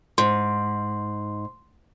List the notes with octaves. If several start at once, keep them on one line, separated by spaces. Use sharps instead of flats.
G#2 C6